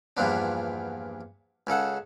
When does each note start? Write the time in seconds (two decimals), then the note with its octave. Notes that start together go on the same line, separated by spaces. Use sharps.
0.17 E2 G2 A#2 F3 B3 D4
1.67 C#2 C#3 A4 F#5